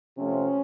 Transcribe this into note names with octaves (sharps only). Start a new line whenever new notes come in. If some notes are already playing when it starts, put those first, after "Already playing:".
C3 F3 A3 C#4